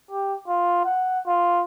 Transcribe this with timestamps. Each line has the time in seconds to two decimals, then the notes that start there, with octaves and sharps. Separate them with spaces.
0.11 G4
0.48 F4
0.85 F#5
1.27 F4